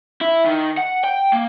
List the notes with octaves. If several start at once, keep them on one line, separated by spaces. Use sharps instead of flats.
E4
D#3
F#5
G5
A#3